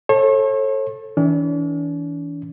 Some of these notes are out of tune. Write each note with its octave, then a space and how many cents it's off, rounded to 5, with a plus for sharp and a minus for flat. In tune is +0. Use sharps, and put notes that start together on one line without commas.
A4 +0 C#5 -40
E3 -30 D4 -45